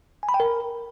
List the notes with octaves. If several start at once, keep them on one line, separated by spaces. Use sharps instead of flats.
G#5
B5
G5
A#4